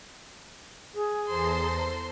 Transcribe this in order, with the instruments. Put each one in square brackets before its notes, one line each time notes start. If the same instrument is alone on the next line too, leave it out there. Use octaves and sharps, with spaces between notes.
[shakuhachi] G#4
[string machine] E2 A5 A#5 [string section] A4 C5 C6